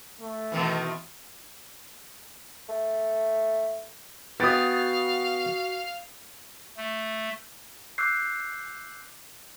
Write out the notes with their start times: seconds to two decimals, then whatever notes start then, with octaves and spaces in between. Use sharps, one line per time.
0.21 A3
0.52 B2 D#3 E3
2.69 A3
4.40 B3 F#4 F5 G5 D#6 A6
6.77 A3
7.98 D6 E6 F#6 G6 C7